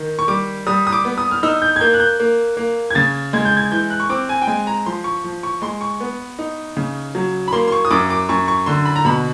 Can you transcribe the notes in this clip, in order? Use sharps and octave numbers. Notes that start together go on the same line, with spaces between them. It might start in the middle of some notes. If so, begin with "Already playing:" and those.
Already playing: D#3
C#6
G3 D6
G3 D#6
D#6
D6
B3
D#6
F6
D#4 E6
G6
G#6
A#3 G6
F#6
G6
A#3
A#3
G#6
C#3 A6
G#3 G#6
G6
G#6
E3 G6
F#6
C#6
C4 D6
G#5
G5
G#3 G#5
A#5
F3 C6
C#6
F3
C#6
G#3 C6
C#6
B3
D#4
C#3
F#3
B5
A#3 C6
C6
C#6
D#6
F#2 D6
D6
F#2 C#6
C#6
D3 C6
B5
A#5
B2 B5